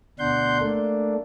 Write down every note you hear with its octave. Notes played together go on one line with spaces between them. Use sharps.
D2 B2 D4 F#5 C6 G6
A3 A#3 D4